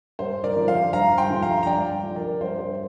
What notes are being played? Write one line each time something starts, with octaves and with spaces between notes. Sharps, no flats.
G2 C5
A#4 D5
D3 F3
C5 F5
G2 F5 A#5
G5 C6
D3 F3
F5 A#5
A#5
G2 D5 G5
D3 F3
A#4 D5
G2 C5
C5